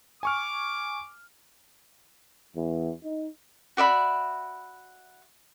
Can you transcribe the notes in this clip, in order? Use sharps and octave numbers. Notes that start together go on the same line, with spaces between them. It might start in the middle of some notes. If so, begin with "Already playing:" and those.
G#5 C#6 D6 F6
E2
D#4
F#4 D5 E5 B5